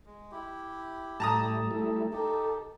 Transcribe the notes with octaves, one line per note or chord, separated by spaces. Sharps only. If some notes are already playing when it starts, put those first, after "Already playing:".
G#3
E4 G4
A2 G3 A5 A#5 D#6
G3 A3 E4
D#4 G4 A4